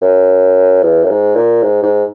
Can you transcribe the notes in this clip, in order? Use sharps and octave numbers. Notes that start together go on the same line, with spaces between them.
F#2
E2
F#2
G#2
A#2
G#2
G#2